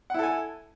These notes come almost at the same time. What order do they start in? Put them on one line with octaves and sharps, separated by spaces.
F#5 E4 A4 G#5